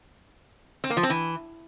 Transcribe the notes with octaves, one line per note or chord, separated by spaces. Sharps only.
C4
A#3
F3
C4
E3